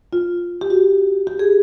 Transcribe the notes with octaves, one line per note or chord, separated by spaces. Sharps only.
F4
G4
F#4
G4
G#4